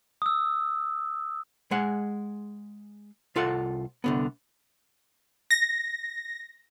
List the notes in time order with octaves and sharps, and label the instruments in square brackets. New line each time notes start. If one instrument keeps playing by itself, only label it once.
[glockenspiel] D#6 E6
[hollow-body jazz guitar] G#3 G#4 F#5
C2 F4 A4 F#5
C2 D3 B3
[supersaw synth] A#6